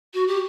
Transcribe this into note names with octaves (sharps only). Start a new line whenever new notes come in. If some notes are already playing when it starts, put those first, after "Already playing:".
F#4
G4